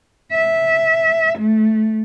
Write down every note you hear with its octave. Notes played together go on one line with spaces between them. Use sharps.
E5
A3